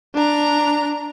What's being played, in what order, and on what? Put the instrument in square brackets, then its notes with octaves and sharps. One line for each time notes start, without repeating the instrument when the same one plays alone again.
[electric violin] D4 A#5